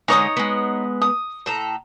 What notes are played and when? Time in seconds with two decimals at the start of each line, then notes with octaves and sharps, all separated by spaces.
0.08 D3 G#3 D#4 C#5 D#6
0.37 G#3 B3
1.02 D#6
1.46 A2 A4 A#5